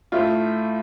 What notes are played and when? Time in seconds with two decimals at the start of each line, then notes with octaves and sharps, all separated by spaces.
0.12 A2 A3 F4